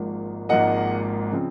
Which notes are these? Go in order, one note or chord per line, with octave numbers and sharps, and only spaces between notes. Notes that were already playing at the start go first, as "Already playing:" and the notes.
Already playing: G#1 G#2 F3 A#3
G#1 G#2 F3 A#3 D#5 F#5
C#3 F3 C4